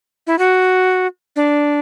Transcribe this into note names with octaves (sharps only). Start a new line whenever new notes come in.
E4
F#4
D4